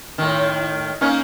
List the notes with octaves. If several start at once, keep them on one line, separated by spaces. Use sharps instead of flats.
A2 D#3
A#3 C#4 D#4